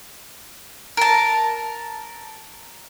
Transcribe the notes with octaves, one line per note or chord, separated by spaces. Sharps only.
A#4 A5